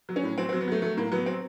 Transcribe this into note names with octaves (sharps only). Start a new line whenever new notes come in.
F#3
C#4
A2
F#3 C4
C4
F#3
B3
F#3 A3
F#3 A3
A2 A#3
F#3 B3
F#3 C4